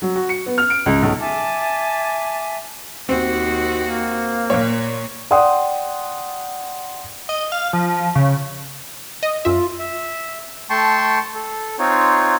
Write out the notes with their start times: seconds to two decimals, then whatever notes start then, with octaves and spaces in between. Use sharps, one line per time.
0.02 F#3
0.16 F#4
0.29 C#7
0.46 B3
0.58 F6
0.70 D7
0.86 C#2
1.02 B1
1.19 E5 G#5 A5 D6
3.09 D#2 C4 F#4
3.80 A#3
4.50 A#2 C#5
5.31 D5 F#5 G5 C6 D#6
7.29 D#5
7.52 F5
7.73 F3
8.15 C#3
9.23 D#5
9.45 F#2 F4 E5
9.79 E5
10.70 A3 G5 A5 C6 C#6
11.35 A4
11.79 C4 D#4 F4 C#5